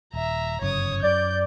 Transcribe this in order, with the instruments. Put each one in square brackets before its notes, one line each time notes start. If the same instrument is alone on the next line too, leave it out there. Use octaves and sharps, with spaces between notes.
[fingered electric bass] D#1 [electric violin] E5 A#5
[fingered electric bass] G1 F#2 C#3 [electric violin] C#5 D#6
[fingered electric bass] F#2 [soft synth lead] D5 [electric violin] G6